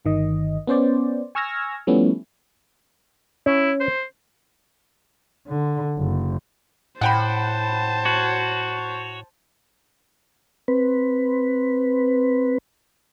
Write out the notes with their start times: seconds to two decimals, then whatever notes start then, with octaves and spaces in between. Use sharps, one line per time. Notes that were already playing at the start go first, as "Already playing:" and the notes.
0.05 G1 D#3 D#5
0.67 B3 C#4 C5 D5
1.35 G#5 C#6 E6 F6 G#6 A#6
1.87 F3 G3 A3 B3 C#4 E4
3.46 C#4 E4
3.80 C5
5.47 D3
5.96 F#1
7.01 A2 C5 F#5 G5 A5 B5
8.05 F#4 C#5
10.68 C4 B4